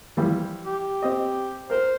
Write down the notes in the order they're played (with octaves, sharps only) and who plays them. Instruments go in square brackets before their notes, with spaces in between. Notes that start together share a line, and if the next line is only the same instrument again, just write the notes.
[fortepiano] E3 F3 G3
[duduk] G4
[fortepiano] C4 D#5
[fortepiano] A#4 F6 [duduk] C5